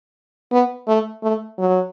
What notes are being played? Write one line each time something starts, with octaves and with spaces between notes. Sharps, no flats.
B3
A3
A3
F#3